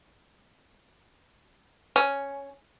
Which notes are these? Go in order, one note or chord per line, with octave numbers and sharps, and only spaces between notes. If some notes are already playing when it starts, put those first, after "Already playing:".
C#4